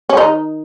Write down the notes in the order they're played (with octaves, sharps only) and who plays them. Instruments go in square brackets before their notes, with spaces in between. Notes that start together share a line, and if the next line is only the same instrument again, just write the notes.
[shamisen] C#4
D#3 D#4